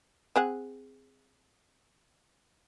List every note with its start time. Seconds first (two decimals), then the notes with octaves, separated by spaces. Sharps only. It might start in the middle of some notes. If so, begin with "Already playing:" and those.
0.36 C4 G#4 F#5